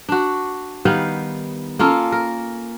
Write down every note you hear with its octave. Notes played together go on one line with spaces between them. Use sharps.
D4 F#4
D#3 G3 B3 F5
A#3 C#4 F4 A4
A#4